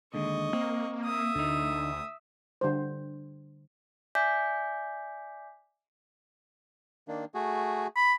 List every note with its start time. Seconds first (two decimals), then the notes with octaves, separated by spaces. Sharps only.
0.14 D#2 D3 G#3 D#5 C#6
0.53 A#3 C4
1.05 E5 D#6
1.35 D2 D3 D#4
2.61 D3 G3 C5
4.15 D5 E5 G#5 D6 G6 B6
7.08 D#3 A#3 D4
7.34 A3 F#4 G#4
7.96 B5